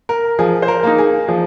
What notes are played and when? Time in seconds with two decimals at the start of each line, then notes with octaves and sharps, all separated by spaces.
0.09 A#4
0.39 F3 G#4
0.62 C5
0.68 A#4
0.83 A#3 D#4
0.98 G#4
1.28 F3 G#4